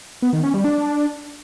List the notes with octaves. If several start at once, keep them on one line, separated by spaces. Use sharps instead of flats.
B3
D#3
C#4
G3
D4